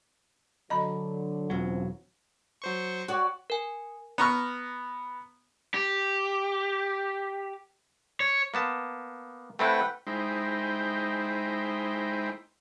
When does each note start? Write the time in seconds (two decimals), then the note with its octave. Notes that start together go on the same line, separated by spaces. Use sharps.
0.70 D3 F#3 D#5 A#5 B5
1.50 E1 C#3 F3 F#3 C4
2.62 F#3 C5 C#6
3.08 F#4 C#5 D5
3.50 A#4 G#5
4.18 B3 A#5 C#6 F6
5.74 G4
8.20 C#5
8.54 A#3 B3 A5
9.59 A3 C4 E4 B4 F#5 G5
10.07 G#3 D#4 E4 C5 G5